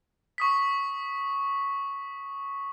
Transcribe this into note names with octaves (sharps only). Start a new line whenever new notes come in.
C#6 D#6 B6